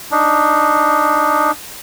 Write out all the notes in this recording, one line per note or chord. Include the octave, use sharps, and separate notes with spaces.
D4 D#4